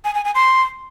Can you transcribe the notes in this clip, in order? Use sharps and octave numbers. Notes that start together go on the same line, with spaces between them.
G#5
G#5
G#5
C6